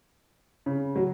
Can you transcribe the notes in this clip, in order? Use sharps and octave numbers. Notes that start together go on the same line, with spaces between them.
C#3
F#3